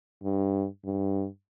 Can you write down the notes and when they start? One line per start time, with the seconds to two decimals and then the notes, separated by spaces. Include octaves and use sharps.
0.23 G2
0.84 G2